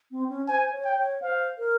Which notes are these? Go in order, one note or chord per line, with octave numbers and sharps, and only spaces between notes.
C4
C#4
C5 G#5
C#5
G5
C#5
C5 F5
A#4